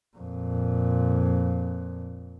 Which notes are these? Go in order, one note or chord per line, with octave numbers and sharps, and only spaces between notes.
F2 A#2